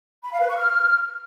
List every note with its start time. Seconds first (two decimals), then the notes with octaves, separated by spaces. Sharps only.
0.24 B5
0.32 F5
0.40 B4
0.49 C#6
0.57 F6